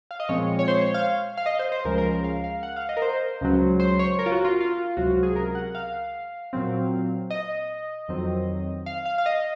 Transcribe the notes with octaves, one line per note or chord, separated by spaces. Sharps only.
F5
D#5
A#2 F3 G#3 C4 C#5
C#5
C5
C#5
F5
F5
D#5
C5
C5
C#2 C#3 F3 G#3 A#4
A#4
A#4
F5
F5
F#5
F5
D#5
A#4
C5
C#2 C#3 F#3
C5
C#5
A#4
F4
F#4
F4
F4
C#2 C3 F#3 F#4
F#4
G#4
A#4
F#5
F5
A#2 F#3 C4
D#5
F2 D#3 F#3 C4
F5
F5
F5
D#5